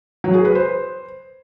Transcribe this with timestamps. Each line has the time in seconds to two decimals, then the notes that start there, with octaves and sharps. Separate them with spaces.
0.24 F#3
0.34 G#4
0.45 B4
0.55 C5